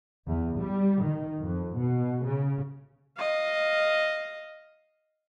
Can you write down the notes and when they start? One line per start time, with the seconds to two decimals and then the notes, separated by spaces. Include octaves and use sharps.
0.24 E2
0.60 G3
1.01 D#3
1.39 F2
1.76 B2
2.24 C#3
3.17 D#5 F5